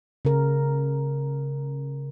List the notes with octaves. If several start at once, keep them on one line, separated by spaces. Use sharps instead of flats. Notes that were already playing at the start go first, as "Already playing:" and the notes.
C#3 A#4